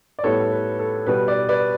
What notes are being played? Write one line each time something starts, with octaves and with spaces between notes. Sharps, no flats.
D5
A2 G3 B3 A4 C#5
B4
A4
B2 G3 B3 B4
B4 D5
B4 D5